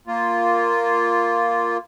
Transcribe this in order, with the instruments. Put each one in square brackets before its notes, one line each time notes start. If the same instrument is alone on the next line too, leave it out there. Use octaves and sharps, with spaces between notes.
[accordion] A#3 F4